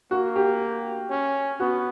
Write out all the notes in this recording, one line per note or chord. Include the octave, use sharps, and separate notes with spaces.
A#3 F#4
G4
C#4
B3 F#4